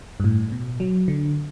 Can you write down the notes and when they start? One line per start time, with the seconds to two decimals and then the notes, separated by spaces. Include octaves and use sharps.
0.20 G2
0.24 A2
0.52 B2
0.80 F#3
1.08 D3